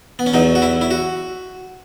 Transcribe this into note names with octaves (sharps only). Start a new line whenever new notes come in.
B3
C#4
E2 B2 F#3 D#4
F#4
E4
E4
F#4